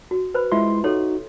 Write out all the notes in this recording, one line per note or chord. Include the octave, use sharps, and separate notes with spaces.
F#4
B4 C5 B5
G#3 E4 F4 E5 C6
D#4 F#4 A4 C#5 C6